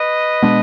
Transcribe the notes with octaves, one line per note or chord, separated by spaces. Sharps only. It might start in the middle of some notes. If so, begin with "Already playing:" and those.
Already playing: B4 D#5
B2 G#3 B3 D4